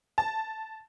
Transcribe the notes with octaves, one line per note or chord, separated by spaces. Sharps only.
A5